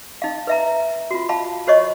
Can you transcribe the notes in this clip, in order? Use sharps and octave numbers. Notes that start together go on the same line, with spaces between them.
D#4 F5
B4 E5 A#5
F4 F#4
F5 A5 B5
F#4 C5 C#5 D#5 C#6